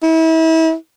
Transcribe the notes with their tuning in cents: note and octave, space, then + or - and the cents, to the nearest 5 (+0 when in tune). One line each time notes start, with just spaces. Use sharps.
E4 -35